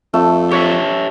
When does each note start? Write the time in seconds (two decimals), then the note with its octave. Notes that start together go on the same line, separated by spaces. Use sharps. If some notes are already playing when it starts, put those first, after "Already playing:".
0.14 F2 A3
0.51 G4 C#5 E5 C#6